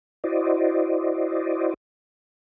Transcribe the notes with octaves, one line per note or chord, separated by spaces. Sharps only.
E4 F#4 C5 D5 D#5